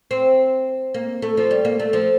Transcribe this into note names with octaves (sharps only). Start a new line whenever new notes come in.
C4
A#3
A3
F3
G3
A#3
A3
F3